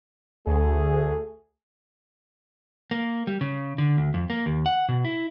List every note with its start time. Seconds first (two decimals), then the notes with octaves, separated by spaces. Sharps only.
0.47 D2 A3 G#4
2.91 A#3
3.27 G3
3.41 C#3
3.78 D3
3.97 D2
4.14 F2
4.30 A#3
4.46 D#2
4.66 F#5
4.89 B2
5.05 E4